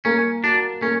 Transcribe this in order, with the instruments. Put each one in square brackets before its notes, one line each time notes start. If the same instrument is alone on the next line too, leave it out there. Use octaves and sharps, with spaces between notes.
[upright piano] A#3 [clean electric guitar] C#4
[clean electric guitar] D4 [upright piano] F#4
[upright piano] A#3 [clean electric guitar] C#4